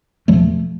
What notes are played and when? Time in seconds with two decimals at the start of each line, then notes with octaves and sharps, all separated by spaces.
0.28 E2 B2 F3 A3